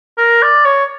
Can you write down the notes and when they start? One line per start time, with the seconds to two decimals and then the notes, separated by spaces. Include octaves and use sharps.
0.18 A#4
0.42 D5
0.65 C#5